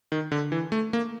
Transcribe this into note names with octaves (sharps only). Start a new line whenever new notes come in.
D#3
D3
E3
A3
A#3